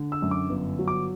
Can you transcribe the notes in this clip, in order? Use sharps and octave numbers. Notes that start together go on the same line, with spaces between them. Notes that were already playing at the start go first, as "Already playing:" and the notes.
Already playing: D3
E6
F#2
D6
G1
F#3
D6